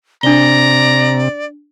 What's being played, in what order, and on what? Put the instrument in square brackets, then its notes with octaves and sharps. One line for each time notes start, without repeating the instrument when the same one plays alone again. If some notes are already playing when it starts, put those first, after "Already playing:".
[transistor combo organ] C3 [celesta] D4 G7 [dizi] D5 [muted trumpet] A#5